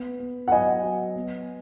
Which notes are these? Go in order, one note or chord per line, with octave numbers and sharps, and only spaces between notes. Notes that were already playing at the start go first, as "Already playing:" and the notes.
Already playing: B3
B3
F#5
F#3 D#5 G#5
F#3
B3